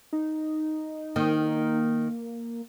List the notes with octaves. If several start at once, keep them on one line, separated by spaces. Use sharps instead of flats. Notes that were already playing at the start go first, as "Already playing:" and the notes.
D#4
D#3 A#3